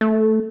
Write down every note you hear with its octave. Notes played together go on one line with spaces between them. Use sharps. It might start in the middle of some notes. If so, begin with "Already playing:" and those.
A3